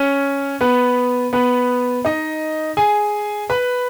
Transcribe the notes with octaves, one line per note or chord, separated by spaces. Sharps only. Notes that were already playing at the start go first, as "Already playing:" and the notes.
Already playing: C#4 C#5
B3 B4
B3 B4
D#4 D#5
G#4 G#5
B4 B5